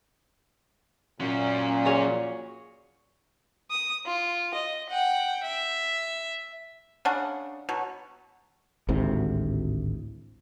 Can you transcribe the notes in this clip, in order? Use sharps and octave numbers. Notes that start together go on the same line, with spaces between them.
A#2 F#3 C#4
F#4 G#4 C#5
D#6
F4
D#5
F#5 G5
E5
C#3 D4 F#5
B2 F#3
G#1 D2 A2 C3